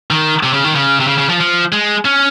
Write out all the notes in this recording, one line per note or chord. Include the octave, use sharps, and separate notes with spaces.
D#3
C3
C#3
D#3
C#3
C3
C#3
C#3
F3
F3
G#3
C#4